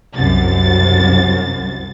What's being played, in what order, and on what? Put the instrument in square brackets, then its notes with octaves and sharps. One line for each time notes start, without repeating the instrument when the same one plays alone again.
[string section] C2 F#2 A6